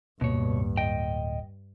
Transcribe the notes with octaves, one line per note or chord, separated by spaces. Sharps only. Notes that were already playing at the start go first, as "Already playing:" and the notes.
D1 G2 B2 A#3 C#5
D#5 G5